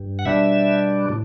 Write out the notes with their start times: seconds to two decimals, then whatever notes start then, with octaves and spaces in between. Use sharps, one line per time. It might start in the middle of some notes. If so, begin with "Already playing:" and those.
Already playing: G2
0.19 F#5
0.25 B2 G3 D4 E5
1.09 A2